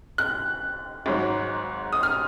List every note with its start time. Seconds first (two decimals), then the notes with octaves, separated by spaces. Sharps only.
0.18 F#6
1.06 G#1 G#2 F#3
1.93 D#6
2.03 F6